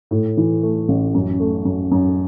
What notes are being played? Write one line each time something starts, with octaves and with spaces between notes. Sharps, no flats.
A2
E3
A3
A1
F#2
A3
F#2
F#2